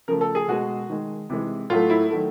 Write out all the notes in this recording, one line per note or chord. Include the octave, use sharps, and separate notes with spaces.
C#3 F3 A3 A#4
A4
G#4
B2 G#3 F#4
D#3 G#3
C3 E3 G#3
A2 F#3 A3 F4
E4
D#3 F#3 A3